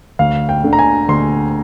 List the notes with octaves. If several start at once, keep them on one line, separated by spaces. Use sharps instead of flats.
D2 F5
G5
D3
A#5
G#5
D2 C6